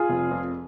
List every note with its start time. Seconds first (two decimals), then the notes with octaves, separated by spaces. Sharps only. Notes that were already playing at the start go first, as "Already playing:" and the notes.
Already playing: F4 G#4
0.10 F1
0.31 F2